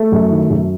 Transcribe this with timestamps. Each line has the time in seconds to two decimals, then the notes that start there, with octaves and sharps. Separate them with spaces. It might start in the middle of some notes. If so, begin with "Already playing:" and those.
Already playing: A3
0.12 F#2
0.31 D#3
0.50 F#2